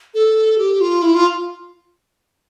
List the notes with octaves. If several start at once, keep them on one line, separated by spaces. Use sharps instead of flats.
A4
G4
F4
E4
F4